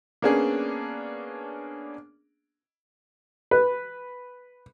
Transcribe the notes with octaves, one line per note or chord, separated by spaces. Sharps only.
A#3 B3 C#4 D4 G#4
B4